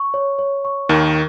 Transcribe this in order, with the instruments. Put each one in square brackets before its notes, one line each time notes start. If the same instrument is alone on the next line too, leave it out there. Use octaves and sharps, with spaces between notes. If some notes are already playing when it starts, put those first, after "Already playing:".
Already playing: [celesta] C#6
C#5
C#5
C#6
[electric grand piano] D#2 D#3 [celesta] A#4